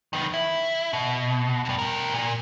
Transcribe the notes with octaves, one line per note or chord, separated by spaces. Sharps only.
D#3 B3
E4
B2
G2 B2
G4 A#4
A#2